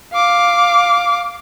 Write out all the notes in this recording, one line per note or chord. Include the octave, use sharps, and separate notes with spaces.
F5 D6